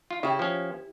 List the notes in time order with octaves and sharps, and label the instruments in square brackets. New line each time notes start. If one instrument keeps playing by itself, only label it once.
[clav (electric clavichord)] F4
[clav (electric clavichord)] C#3 [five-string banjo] E4 G4
[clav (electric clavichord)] F3 C#4